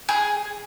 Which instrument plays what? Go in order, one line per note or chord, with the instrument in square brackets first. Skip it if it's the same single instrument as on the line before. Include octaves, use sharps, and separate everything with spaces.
[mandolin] G#4